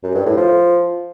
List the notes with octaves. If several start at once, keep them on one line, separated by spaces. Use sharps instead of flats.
F#2
G2
A2
F3